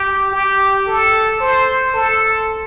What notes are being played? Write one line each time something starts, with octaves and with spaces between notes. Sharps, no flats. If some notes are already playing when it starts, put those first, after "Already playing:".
Already playing: G4
G4
A4
C5
A4